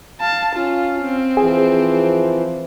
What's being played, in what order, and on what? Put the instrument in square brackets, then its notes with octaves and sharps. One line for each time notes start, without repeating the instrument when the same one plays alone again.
[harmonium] F5 [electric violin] A5
[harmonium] C#4 F5 [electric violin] F4
[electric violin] C4
[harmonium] E3 F3 [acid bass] G#4